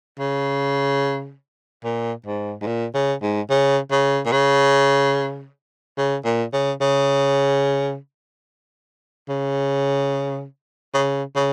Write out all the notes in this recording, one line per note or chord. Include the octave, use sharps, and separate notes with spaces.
C#3
A#2
G#2
G#2
A#2
C#3
G#2
C#3
C#3
A#2
C#3
C#3
A#2
C#3
C#3
C#3
C#3
C#3